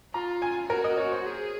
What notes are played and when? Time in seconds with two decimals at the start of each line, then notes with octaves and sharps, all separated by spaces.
0.14 F4 A#5
0.42 G#5
0.70 F#4 A#4
0.84 D#5
0.97 C#5
1.12 C5
1.26 G#4